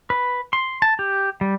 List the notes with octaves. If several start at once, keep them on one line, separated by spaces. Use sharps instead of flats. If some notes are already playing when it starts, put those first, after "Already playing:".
B4
C6
A5
G4
G3